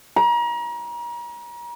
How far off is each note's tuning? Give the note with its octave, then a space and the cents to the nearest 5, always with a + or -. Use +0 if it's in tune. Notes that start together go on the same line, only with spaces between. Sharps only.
A#5 +35